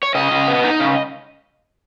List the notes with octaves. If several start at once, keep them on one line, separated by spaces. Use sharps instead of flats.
C#5
C#3 D#5
C#3
B3
D#4
C#3